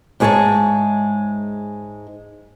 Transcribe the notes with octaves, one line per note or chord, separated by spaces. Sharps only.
G#2 G#3 G#4 C#5 E5 A5